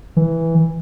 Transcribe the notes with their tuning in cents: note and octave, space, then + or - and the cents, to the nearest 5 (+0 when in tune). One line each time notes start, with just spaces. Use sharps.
E3 -5